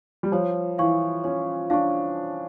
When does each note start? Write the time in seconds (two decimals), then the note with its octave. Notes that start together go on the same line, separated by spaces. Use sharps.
0.23 G3
0.32 F3 C#5
0.78 E3 F5 C#6
1.24 C#4 C#5
1.70 D4 F5 C#6